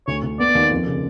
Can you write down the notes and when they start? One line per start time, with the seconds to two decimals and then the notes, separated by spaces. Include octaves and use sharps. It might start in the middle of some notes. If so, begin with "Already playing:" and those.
0.07 D2 C#5
0.23 D2
0.40 B3 D5
0.55 D#2
0.71 F2
0.87 C#3